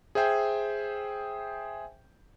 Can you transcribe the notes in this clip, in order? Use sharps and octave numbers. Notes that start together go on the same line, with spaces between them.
G#4 C5 E5 G5 G#5 G6